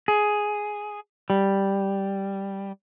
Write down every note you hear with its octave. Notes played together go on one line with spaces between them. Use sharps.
G#4
G3